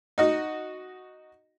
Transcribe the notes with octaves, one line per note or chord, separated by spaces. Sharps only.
D#4 F#4 D#5